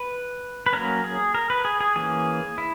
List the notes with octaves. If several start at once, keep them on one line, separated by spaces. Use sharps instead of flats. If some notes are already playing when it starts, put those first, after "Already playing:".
Already playing: B4
B4
F#3 A#3 C#4 A#4
G#4
A#4
B4
G#4
G#4
E3 A#3 C#4 G#4
E4